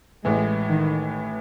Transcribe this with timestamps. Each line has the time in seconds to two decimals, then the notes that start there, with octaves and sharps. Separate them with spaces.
0.24 A1 A2 E3 G#3
0.69 D#3